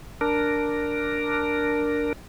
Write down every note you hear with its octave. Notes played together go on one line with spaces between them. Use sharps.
D4 A#4